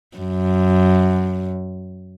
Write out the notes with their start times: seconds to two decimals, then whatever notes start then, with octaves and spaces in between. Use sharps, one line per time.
0.17 F#2